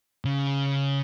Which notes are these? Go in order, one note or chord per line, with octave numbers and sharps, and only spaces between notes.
C#3